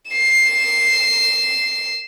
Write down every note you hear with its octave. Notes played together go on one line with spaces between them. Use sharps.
C7 E7